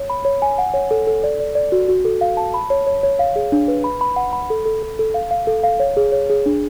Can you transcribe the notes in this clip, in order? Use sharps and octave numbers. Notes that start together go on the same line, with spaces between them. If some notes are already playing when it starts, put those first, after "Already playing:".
Already playing: C#5
B5
C#5
G#5
F#5
C#5
A4
A4
D5
D5
D5
F#4
F#4
A4
F5
A5
B5
C#5
C#5
C#5
F5
G#4
D4
B4
B5
B5
F#5
B5
A4
A4
A4
A4
F5
F5
A4
F5
C#5
G#4
C#5
G#4
D4